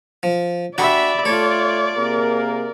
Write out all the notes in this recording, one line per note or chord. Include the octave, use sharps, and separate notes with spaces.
F3
D4 F#4 G4 D5 E5 B5
A3 F4 A4 C#5
C3 A#3 G#4 A#4